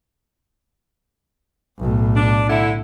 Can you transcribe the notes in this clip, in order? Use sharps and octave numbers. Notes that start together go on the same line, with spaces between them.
B1 A2
D4
D3 E4